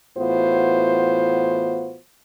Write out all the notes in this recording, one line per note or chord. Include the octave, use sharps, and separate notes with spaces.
A2 E3 B3 F4 F#4 C5